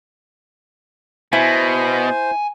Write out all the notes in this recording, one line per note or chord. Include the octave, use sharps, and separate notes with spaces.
B2 E4 C5 G#5